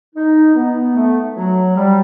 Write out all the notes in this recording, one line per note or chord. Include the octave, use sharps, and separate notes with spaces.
D#4
B3
A3
F#3
G3